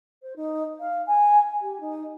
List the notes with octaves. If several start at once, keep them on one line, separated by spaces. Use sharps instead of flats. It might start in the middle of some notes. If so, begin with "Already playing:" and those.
C5
D#4
F5
G#5
G4
D#4